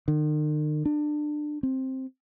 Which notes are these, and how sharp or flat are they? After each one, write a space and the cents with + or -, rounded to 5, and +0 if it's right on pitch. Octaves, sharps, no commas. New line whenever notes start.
D#3 -45
D4 +25
C4 +10